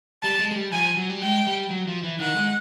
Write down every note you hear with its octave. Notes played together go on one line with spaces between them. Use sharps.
G3 A5
G#3
G#3
G3
F3 G#5
F#3
G3
G#3 G5
G3
F#3
F3
E3
D#3 F#5
G#3